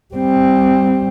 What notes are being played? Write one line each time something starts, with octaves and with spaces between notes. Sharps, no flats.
G3 C4